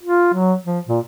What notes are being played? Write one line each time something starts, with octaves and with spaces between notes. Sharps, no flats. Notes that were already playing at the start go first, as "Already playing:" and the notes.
F4
F#3
F3
A#2